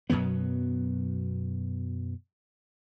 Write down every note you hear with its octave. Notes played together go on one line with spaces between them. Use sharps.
F#2 B2 F#3 B3